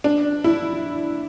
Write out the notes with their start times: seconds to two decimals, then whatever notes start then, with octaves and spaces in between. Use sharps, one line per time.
0.04 D4
0.44 E4